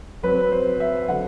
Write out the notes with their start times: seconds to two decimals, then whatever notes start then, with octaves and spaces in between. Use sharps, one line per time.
0.23 F#2 F#3 C4 B4
0.52 C5
0.80 E5
1.08 D3 F#3 F#5